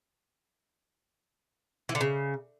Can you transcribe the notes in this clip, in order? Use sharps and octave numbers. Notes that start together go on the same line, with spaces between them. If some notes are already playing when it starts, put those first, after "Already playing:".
E3
D3
C#3